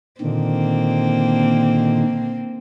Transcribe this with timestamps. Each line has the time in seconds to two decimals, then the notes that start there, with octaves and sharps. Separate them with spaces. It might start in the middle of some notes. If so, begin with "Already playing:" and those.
0.21 A#2 D3 D#3 A#3 C4